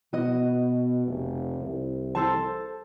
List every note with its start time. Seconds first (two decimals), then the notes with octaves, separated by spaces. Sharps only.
0.13 B2 F#4 D#5
1.07 F1
1.61 C2
2.15 A4 C5 A5